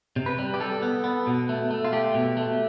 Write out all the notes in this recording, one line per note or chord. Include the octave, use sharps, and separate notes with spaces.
C3
B4
G3
G4
G3 A4
B3
B3
B2
A3
A3
F4
A3 G4
B2
A3